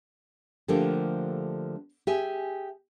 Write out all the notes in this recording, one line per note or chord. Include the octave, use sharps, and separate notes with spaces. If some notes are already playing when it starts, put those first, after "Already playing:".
D3 F3 A3 A#3 D4 G4
G4 G#4 E5 G#5